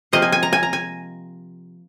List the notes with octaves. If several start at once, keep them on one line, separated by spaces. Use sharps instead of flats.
C3 F3 A#3 D#5
G#5
G#5
A#5
G#5
A#5
G#5